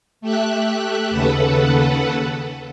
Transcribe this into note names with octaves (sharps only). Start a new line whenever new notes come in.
A3 G4 E5 F#6
D#2 C#3 A4 B4 F#5